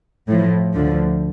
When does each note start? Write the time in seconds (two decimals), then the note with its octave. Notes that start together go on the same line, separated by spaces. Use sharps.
0.28 A2 F3
0.74 D2 D3 F3